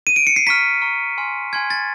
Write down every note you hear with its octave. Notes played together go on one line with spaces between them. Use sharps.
D#7
D7
C#7
C7
A#5 C#6 F6 B6
A#5 C#6 F6
G#5 C6 F6
G#5 C6 F6 G#6
A6